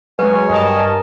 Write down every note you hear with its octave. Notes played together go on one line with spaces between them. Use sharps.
F#3 G#3 B4 C#5 G#5
G2 A#4 D#5 A5